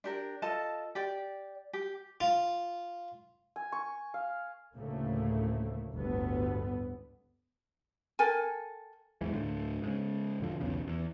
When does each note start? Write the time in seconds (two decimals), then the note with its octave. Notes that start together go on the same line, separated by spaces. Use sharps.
0.04 D4 G4 A#4
0.42 F4 A4 D#5 A5
0.95 G4 D5 G5
1.73 G4
2.21 F4
3.56 G#5
3.72 C#6
4.14 F5
4.76 D2 A2 C#3 A3 A#3
5.94 G1 D2 A2 D3 B3
8.19 A4 A#4 G5 G#5
9.21 E2 G#2 E3
9.33 D2 A2 D3
9.82 G#2 C#3
10.40 E1 D3 F3
10.60 E1 B1 E2 C#3
10.87 E2